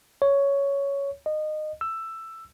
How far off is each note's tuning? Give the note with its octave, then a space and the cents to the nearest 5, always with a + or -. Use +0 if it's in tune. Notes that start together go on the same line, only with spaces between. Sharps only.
C#5 +10
D#5 -20
E6 +10